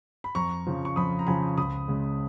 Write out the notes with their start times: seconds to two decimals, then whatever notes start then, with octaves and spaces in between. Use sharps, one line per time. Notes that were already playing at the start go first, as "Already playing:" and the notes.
0.24 B5
0.35 F2 A#5 C#6
0.67 C#3 F3
0.85 C#6
0.96 F2 B5 D#6
1.19 A#5
1.27 C#3 F3 G#5 B5
1.58 C#2 B5 D#6
1.88 C#3 G#3